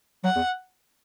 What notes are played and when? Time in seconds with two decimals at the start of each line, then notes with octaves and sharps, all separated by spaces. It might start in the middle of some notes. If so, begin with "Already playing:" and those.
0.24 F#3 F#5
0.36 E2